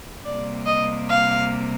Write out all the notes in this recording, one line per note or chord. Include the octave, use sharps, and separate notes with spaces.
C3 G3 A#3 D5
D#5
F5